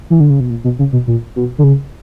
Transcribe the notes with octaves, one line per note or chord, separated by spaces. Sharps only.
E3
D3
C#3
B2
A#2
B2
C#3
B2
A#2
B2
D3
C#3